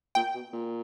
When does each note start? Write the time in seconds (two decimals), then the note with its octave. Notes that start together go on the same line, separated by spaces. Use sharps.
0.15 A#2 G5
0.35 B2
0.53 A#2